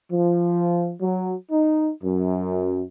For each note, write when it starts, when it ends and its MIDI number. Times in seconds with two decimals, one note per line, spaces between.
0.11 0.92 53
1.01 1.35 54
1.50 1.90 63
2.04 2.83 42